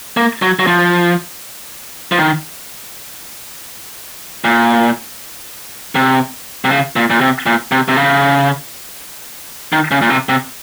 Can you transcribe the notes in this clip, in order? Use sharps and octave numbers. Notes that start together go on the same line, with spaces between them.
A#3
F#3
F#3
F3
F3
D#3
A#2
C3
C3
C#3
A#2
A#2
C3
A#2
C3
C3
C#3
D#3
C#3
A#2
C3
C3